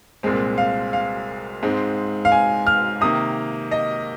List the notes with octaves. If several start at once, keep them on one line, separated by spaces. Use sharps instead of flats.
C2 A#2 G#3 C4
F5
F5
G#2 G#3 C4
F5
G#5
F6
C3 D#3 A#3 D#6
D#5